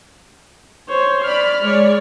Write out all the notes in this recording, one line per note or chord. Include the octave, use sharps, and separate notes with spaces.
C5 C#5
D5 B5 F6
G#3 C#5 D5